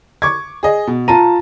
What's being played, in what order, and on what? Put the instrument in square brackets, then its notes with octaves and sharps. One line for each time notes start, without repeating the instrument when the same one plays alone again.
[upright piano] C#6 D6 G#6
G#4 D#5
B2
[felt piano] F4 A5 A#5 [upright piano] D#7